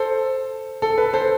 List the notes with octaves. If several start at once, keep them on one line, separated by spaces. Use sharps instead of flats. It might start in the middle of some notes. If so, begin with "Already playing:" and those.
Already playing: A4 C5
A4
B4
A4 C5